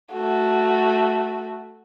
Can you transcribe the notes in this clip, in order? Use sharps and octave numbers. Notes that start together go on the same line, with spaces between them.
A3 F#4